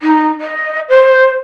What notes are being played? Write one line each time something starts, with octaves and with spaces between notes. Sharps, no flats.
D#4
D#5
C5